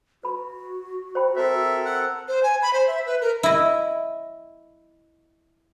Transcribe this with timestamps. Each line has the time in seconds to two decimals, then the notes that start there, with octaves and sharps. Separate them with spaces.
0.23 F#4 B4 B5
1.15 C5 G5 B5
1.37 C4 A4 A#4 C5 E5
1.86 F#5
2.28 C5
2.43 G#5
2.62 B5
2.73 C5
2.87 E5
3.06 B4
3.21 A#4
3.43 E4 D#5